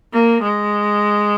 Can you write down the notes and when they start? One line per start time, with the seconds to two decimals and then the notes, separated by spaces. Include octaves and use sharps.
0.14 A#3
0.43 G#3